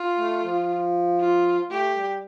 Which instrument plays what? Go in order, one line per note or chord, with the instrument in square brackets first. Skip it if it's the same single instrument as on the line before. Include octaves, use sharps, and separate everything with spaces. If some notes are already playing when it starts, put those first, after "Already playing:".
Already playing: [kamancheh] F4
[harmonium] A3
F3
[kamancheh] F4
[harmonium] A3 [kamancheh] G4
[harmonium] G3